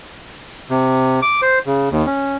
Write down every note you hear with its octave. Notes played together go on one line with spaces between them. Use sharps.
C3
D6
C5
C#3
D#2
C#4